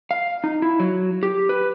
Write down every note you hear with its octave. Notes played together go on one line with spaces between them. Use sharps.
F5
D#4
E4
F#3
G4
B4